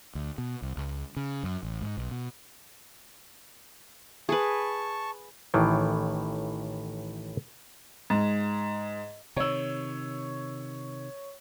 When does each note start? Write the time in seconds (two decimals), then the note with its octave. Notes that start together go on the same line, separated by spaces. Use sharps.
0.15 D2
0.38 B2
0.62 C2
0.77 C#2
1.17 C#3
1.43 F#2
1.63 A1
1.82 G#2
1.97 B1
2.11 B2
4.29 G#4 B4 A5 C#6
5.54 A1 A2 D#3 E3
8.10 G#2
9.36 C3 D#3 C#5 E6